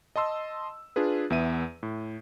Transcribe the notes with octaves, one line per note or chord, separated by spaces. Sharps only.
D#5 A5 C6 E6
D4 F4 G#4 B4
E2 B3 E5 D#7
A2